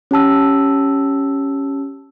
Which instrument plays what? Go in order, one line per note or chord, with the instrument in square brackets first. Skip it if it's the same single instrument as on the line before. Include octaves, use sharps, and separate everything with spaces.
[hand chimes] C#4 G4 A5 E6